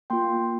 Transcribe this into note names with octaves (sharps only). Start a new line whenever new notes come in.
A#3 F4 G5 C6